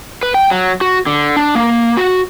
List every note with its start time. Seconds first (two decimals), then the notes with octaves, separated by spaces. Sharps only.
0.23 B4
0.34 G5
0.51 F#3
0.81 F#4
1.06 D3
1.37 D4
1.55 A#3
1.97 F#4